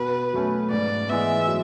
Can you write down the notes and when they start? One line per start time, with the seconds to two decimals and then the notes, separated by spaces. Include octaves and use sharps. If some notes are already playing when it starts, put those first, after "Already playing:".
Already playing: B2 B4
0.33 F#3 A3 C#4
0.70 G#2 D5
1.09 E3 G#3 B3 E5
1.47 F#3